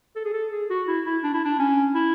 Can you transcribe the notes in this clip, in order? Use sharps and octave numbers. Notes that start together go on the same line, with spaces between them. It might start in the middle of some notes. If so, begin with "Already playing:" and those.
A4
G#4
A4
G#4
F#4
E4
E4
D4
E4
D4
C#4
E4